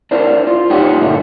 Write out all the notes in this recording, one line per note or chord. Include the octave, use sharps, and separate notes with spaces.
D4 E4 A#4 C5
F4
G3 D#4 F4 G4 C#5 F#5
G2 A#2 D3 A#3 E4